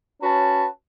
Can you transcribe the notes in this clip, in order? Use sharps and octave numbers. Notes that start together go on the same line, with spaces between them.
C#4 F#4 B4 A5